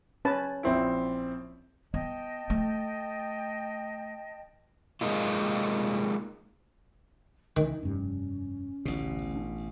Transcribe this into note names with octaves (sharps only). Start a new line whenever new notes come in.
C#4 B4 A5
A#1 C4 E4
B3 D#5 G5 A5
A3
G#3 A#3 D#4 F4
C#2 D#3 E3 D#4
F1 G2 C#4
A1 D2 B2
D4